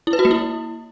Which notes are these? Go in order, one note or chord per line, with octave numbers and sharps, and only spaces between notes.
E4
B4
F#4
A#3
E4